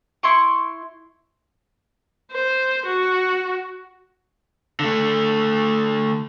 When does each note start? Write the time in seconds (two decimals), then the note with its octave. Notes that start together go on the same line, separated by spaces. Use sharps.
0.23 E4 C6 C#6
2.32 C5
2.86 F#4
4.80 D3 A3